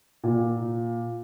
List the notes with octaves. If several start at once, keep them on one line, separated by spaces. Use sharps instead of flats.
A#2